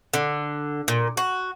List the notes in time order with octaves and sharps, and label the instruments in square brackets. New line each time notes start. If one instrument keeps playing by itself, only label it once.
[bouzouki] D3
A#2
F#4